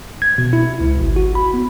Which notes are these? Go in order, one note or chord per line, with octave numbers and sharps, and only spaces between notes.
G#6
B2
E4
C#2
G#1
F#4
B5
B3